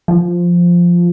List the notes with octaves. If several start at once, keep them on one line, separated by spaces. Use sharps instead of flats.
F3